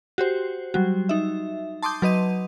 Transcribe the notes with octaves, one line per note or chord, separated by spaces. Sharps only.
F#4 G4 C5
F#3 G3 F#4
D#4 E5
A5 C6 D6 D#6 G6
F#3 B4 D#5 D#7